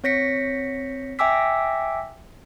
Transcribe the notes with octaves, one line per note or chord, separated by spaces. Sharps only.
C4 C#5 A#6 B6 C#7
E5 G5 G#5 D6 E6 B6